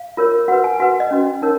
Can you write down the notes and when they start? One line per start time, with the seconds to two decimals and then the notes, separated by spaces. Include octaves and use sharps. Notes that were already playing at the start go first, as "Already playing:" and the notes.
Already playing: F5
0.17 F4 A#4 C#5
0.48 F#4 B4 F#5
0.64 G#5
0.80 F#4 B4 F#5
1.00 D#5
1.11 C#4 F#4 B4
1.42 D#4 A#4 C#5